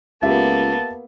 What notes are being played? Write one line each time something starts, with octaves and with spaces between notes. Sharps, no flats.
C#2 A#3 B3 F4 G4 E5 A5